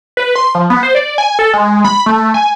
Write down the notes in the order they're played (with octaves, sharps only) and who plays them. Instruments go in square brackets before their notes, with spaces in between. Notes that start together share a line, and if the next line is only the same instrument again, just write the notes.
[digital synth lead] B4
C6
F3
B3
C5
D5
G#5
A4
G#3
B5
A3
G#5